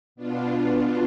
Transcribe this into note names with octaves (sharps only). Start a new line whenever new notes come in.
B2 B3 D4 F4